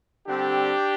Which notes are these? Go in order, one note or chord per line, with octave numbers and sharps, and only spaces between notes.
D3 G3 C4 D4 G4